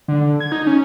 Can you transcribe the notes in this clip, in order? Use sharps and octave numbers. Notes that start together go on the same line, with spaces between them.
D3
G#6
D#4
C#4